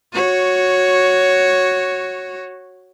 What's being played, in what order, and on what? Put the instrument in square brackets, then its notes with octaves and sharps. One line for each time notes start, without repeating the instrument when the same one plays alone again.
[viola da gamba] F#4 C#5